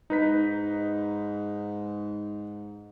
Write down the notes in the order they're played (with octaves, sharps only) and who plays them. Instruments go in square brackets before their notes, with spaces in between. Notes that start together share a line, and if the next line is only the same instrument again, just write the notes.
[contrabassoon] G#2 [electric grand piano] D#4 B4 B6